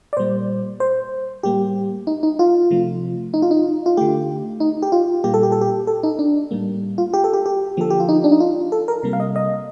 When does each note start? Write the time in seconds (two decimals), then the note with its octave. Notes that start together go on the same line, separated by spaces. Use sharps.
0.13 D5
0.17 A#2 G3 A#3 C5
0.80 C5
1.43 A2 G3 A#3 G4
2.07 D#4
2.23 D#4
2.39 F4
2.71 C3 F3 A3
3.34 D#4
3.42 F4
3.51 D#4
3.86 F4
3.97 D3 A3 G4
4.60 D#4
4.82 G4
4.92 F4
5.24 A#2 G3 A#3 G4
5.34 A4
5.43 G4
5.52 A4
5.61 G4
5.87 A4
6.03 D#4
6.19 D4
6.51 A2 G3 A#3
6.98 F4
7.13 G4
7.24 A4
7.33 G4
7.46 G4
7.77 D3 F3 A#3 A4
7.90 G4
8.00 F4
8.09 D#4
8.24 D4
8.32 D#4
8.40 F4
8.72 A4
8.88 A#4
9.03 C3 G3 A#3
9.13 F5
9.20 D#5
9.36 D#5